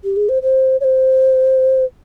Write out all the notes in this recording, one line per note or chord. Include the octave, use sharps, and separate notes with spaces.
G4
G#4
C5
C5
C#5
C5